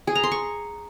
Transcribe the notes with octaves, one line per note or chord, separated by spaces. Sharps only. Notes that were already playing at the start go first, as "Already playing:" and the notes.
G#4
A#5
C6
C#6